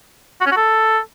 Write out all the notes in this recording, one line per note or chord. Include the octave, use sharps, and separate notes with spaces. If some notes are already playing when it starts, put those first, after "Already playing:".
F#4
C#4
F#4
A4